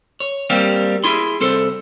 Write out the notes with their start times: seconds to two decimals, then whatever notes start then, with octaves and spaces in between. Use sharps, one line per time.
0.20 C#5
0.50 G3 A#3 C4 G4 F5
1.04 E4 G#4 C6
1.40 C2 C4 A4 C5